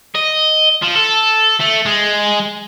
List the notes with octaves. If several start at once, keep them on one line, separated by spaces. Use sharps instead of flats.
D#5
F3
A4
A3
G#3